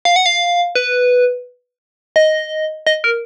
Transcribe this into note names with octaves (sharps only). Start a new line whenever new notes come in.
F5
F#5
F5
B4
D#5
D#5
A#4